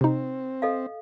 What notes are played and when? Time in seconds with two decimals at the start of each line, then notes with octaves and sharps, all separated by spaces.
0.01 C3 C4 D#4
0.62 A4 D#5 F5